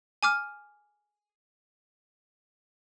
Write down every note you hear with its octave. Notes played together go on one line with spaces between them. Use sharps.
G#5 D6 F6